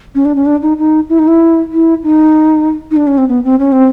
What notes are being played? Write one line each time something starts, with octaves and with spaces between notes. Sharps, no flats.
C#4
D4
C#4
D4
D#4
D#4
E4
D#4
E4
E4
D#4
D#4
D4
C#4
C4
B3
C4
C#4
C4